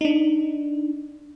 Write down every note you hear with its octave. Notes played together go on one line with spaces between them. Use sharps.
D4 D#4